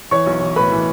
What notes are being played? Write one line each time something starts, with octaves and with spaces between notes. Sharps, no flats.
E3 C#5 C#6
B1
E3
A2 B4 B5
E3